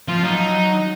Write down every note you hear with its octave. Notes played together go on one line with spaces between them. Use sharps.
F3 F4
F#3 D#4